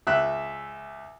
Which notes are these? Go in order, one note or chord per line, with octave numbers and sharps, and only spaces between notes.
C#2 E5 F#6